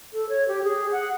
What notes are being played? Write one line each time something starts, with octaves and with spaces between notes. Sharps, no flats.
A4
C#5
G4
G#4
F#5